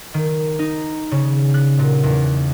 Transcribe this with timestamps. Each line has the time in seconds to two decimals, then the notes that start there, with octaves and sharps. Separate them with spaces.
0.14 D#3
0.59 D#4
1.11 C#3
1.54 F#6
1.78 A#2
2.03 E2